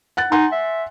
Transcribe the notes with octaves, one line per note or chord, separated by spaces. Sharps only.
F#5 F#6 A6
D#4 F#5 G#5 C6
E5